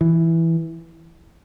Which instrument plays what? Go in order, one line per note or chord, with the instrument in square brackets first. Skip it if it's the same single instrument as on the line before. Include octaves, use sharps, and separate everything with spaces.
[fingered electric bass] E3